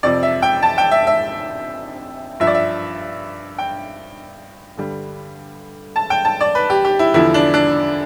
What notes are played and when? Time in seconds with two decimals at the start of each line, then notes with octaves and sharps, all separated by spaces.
0.03 F2 C3 F3 D5
0.23 E5
0.42 G5
0.63 A5
0.78 G5
0.91 E5
1.07 E5
2.40 G2 F3 E5
2.47 D5
2.55 E5
3.58 G5
4.77 G2 D3 G3
5.96 A5
6.10 G5
6.25 A5
6.41 D5
6.55 B4
6.70 G4
6.85 G4
6.99 E4
7.14 E2 D3 F3 E4
7.34 D4
7.54 D4